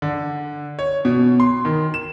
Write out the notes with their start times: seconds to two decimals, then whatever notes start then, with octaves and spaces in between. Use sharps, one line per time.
0.02 D3
0.79 C#5
1.05 B2
1.40 C6
1.65 D#3
1.94 E7